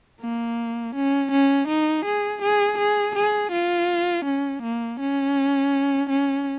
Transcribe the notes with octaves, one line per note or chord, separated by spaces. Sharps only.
A#3
C#4
C#4
D#4
G#4
G#4
G#4
G#4
F4
C#4
A#3
C#4
C#4